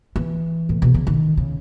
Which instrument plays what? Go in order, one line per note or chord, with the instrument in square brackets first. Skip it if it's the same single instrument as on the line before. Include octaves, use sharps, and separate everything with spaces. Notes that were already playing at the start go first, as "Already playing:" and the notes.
[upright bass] E3
A2
B2
C#3
D#3
C#3